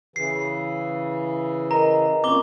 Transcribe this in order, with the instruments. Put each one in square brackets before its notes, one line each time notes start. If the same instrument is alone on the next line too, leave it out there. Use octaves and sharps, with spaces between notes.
[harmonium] C#3 E3 [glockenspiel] C7
[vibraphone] A#4 D#5 [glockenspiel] A#5
[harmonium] A#2 [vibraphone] C4 C#4 [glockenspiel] D6 G7